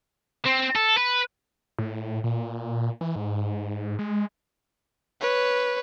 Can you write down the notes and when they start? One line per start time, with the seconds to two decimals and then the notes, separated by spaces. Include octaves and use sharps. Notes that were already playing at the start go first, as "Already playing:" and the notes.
0.45 C4
0.75 A4
0.97 B4
1.79 A2
2.24 A#2
3.01 E3
3.16 G#2
3.99 G#3
5.21 B4 C#5